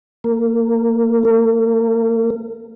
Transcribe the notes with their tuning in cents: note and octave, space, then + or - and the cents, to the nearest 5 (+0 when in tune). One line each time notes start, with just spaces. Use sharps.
A#3 -20
A#3 -40